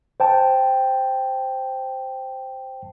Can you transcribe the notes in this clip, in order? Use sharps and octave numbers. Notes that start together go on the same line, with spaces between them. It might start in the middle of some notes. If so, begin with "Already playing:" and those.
C5 G5 A5